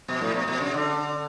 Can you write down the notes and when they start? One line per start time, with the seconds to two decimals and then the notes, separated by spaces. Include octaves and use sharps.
0.08 B2
0.21 A2
0.34 B2
0.48 B2
0.61 C#3
0.74 D3